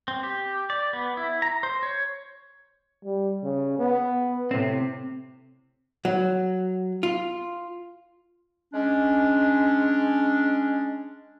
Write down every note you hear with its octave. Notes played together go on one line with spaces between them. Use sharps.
C4
G4
D5
B3
E4
A#5
C5
C#5
G3
C#3
B3
A2 C3 C4
F#3
F4
G#3 C#4 D4